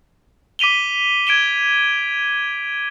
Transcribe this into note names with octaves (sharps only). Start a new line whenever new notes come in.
D6 B6 D#7 F7 G7
G#6 D7 E7 G7